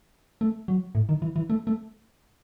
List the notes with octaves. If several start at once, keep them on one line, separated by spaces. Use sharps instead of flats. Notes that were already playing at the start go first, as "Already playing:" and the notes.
A3
F#3
A2
D#3
E3
E3
A3
A3